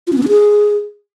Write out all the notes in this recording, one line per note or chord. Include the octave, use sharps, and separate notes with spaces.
F4
C#4
B3
D4
G#4